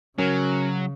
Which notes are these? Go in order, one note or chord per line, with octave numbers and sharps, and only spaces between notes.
C#3 F#3 C#4 A#4